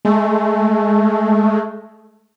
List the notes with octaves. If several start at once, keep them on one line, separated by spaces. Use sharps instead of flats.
G#3 A3